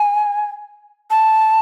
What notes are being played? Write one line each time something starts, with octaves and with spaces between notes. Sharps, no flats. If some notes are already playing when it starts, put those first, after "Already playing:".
Already playing: G#5
A5